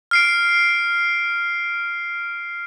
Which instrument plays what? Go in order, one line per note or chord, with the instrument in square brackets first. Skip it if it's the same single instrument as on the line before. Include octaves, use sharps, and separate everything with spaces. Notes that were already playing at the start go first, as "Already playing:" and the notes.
[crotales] F6 C7 D7